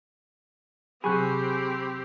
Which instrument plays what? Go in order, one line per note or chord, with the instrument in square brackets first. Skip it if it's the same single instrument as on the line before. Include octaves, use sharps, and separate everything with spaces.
[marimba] C3 F#3 [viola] C4 G4 [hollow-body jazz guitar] G#4 [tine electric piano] B5 C#6 F#6